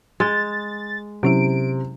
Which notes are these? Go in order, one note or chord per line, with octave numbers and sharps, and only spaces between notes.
G#3 A6
C3 F#3 C#4 E4 D7